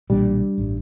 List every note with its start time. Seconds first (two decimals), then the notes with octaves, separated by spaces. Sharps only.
0.10 B1 A#2 E3 G3 D4
0.58 A1 G2